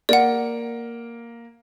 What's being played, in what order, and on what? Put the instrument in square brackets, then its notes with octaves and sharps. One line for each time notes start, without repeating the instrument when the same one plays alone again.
[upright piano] A#3 [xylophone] D5 F#5